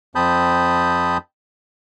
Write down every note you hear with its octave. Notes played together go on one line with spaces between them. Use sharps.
F2 C4 A5 B5 D#6 G6